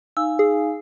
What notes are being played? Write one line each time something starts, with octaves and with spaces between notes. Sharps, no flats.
D#4 F5 G#5 E6
G#4